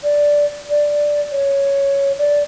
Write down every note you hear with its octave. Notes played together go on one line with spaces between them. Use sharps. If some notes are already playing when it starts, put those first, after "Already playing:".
D5
D5
C#5
D5